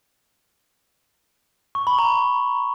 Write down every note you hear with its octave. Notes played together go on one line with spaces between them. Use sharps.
C#6
B5
A#5